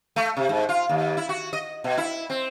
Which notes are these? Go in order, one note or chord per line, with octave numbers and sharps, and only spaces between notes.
A3
C3
G#2
F4
D#2
E4
F#4
D#5
B2
E4
C4